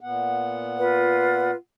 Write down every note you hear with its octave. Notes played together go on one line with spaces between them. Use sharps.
A#2 B3 F#5
F4 B4